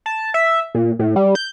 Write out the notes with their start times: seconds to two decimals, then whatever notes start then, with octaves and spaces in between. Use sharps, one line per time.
0.06 A5
0.34 E5
0.75 A#2
0.99 A2
1.16 G3
1.35 G6